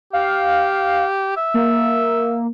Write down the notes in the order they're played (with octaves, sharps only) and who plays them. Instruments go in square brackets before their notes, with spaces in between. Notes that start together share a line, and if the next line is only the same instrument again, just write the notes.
[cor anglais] G4 [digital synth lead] F5
[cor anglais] E5
[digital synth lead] A#3